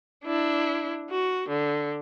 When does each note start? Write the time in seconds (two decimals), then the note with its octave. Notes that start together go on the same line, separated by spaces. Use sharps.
0.25 D4 E4
1.10 F#4
1.48 D3